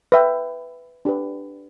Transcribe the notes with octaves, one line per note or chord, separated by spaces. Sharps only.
B4 E5 G5
D4 G4 B4